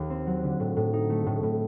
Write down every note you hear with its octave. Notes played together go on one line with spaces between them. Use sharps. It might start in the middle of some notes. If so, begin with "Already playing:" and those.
Already playing: D#2
C4
F#3
D3
A2
A2
D#4
A3
A2
A2